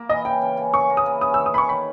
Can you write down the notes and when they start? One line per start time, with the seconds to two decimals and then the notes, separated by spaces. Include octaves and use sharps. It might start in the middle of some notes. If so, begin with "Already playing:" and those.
Already playing: A#3
0.09 E3 D#5
0.25 C#3 G5
0.42 C#3
0.57 C#3
0.73 C#3 C#6
0.90 A#3
0.97 D#6
1.06 E3
1.21 C#4 D#6
1.34 E6
1.38 D#3
1.46 D#6
1.54 C#4 B5
1.58 C#6
1.69 D#3 B5